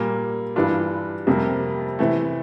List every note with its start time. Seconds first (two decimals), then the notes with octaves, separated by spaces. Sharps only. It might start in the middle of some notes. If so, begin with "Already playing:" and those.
Already playing: A#2 G3 A#3
0.56 G2 E3 G3 D4 F4
1.27 F2 C3 G3 A#3
1.99 C3 E3 A3